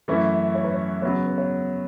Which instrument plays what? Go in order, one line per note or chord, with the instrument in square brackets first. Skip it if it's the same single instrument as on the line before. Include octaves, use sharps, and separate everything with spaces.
[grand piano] F#2 E3 A3 C#4 E4 [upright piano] B4
[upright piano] C#5
B4
C#5
[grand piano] C#3 F#3 B3 [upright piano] C#5
[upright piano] B4
C#5